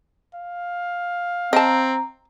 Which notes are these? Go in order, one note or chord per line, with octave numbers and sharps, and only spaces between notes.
F5
C4 D#5 A5 A#5